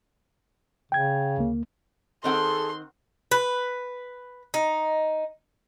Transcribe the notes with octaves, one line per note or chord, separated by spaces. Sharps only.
C#3 G5 G#6
D2 A#3
D#3 C4 G#4 A4 F#5 C6
B4
D#4